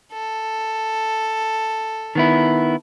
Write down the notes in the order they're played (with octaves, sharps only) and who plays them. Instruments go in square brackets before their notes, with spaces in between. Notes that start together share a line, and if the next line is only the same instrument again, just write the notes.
[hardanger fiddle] A4
[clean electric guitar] D#3 B3 E4